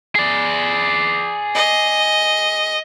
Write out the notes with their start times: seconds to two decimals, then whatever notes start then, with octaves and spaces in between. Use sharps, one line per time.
0.16 G#4 D5
1.55 D#5